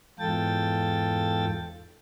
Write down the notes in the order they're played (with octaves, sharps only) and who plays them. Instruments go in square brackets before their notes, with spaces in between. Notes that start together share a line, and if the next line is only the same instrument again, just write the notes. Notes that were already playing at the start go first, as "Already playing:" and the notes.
[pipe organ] E2 G#2 F4 A4 G5 A6